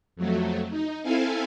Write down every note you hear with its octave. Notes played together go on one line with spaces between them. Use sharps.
F2 F#3 A3
D#4
C4 E4 A4 F5 G#5